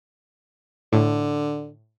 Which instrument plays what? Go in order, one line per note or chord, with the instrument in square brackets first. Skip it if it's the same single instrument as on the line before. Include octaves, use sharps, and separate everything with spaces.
[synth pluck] A2 [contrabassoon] D3